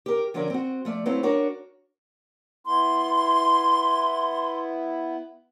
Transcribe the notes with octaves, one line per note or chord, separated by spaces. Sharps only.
G4 A#4
D3 F3 F#3 C#4 A#4 D5
C4 F#4
F3 A3 D5
F#3 A3 C4 E4 B4 F5
D4 F#4 A#4 C#5
B3 E4 C6